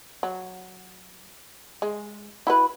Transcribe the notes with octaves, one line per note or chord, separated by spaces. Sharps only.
F#3
G#3
E4 F#4 B4